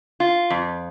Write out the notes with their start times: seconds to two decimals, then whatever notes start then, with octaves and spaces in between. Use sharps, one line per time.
0.20 F4
0.50 F2